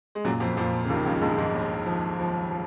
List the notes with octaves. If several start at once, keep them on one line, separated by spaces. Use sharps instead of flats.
G#3
F#2 A#2 F#3
F2 F3
F2 A#2 F3
C#3
A#1 D#2 D#3
C#2 C#3
A#1 G#2 G#3
G#2 G#3
D#2
F3
F3
F3